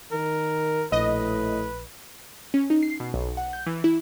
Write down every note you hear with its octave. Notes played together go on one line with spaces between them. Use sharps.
D#3 A#4
A#1 A2 B4 D#5
C#4
D#4
C7
B2
B1
F#5
G6
E3
E4